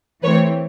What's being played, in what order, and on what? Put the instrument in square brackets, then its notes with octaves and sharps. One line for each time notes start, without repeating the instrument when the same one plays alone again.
[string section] E3 A3 C4 B4 C#5